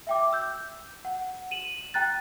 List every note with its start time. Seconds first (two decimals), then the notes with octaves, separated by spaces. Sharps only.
0.07 E5 G5 D6
0.33 E6 G6
1.05 F#5
1.51 D#7 E7 F#7
1.94 G5 A#5 F#6 A6